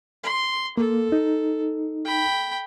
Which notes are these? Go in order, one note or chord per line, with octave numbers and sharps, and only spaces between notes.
C6
A#3 A4
D#4
G5 B5